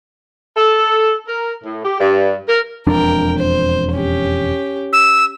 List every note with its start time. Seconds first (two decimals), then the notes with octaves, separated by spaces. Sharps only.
0.55 A4
1.27 A#4
1.62 A2
1.84 G4
1.99 G2
2.47 A#4
2.87 E1 F2 D4 A#4 G5
3.38 C5
3.92 C#4 G4
4.93 E6